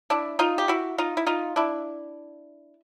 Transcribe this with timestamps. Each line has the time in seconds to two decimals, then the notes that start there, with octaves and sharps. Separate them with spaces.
0.10 D4 E4
0.39 D#4 F4
0.58 G4
0.68 E4 F#4
0.98 D#4 F4
1.17 E4
1.27 D#4 F4
1.56 D4 E4